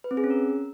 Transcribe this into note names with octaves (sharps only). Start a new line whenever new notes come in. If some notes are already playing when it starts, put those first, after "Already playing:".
B4
C4
G#4
C#4
A#4